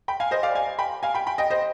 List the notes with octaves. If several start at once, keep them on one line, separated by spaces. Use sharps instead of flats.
G5 B5
F5 G#5
C5 D#5
D5 F5
F5 G#5
G5 B5
F5 G#5
G5 B5
G5 B5
D#5 G5
C5 D#5